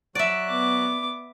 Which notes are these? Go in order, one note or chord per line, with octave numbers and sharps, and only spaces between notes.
F#3 F#4 D5 E5 F#6
B3 D6